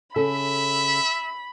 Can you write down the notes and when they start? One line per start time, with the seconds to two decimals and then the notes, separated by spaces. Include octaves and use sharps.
0.16 C#3 A4 E5 B5